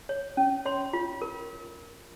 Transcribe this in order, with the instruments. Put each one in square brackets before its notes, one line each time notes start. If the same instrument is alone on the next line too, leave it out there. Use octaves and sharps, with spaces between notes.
[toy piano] C#5
C#4
C#5 C6
F4
A#4